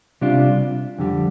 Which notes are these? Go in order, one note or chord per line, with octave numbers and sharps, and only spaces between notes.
C3 G3 D4 F4
F2 D3 G3